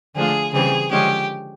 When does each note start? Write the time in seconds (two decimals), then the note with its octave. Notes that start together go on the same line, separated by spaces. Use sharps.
0.15 D3 F3 A3 D4 F4 G#4
0.53 C#3 E3 G3 C4 G#4
0.91 D3 F3 G#3 C#4 G4